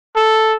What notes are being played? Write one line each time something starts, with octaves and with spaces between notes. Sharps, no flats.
A4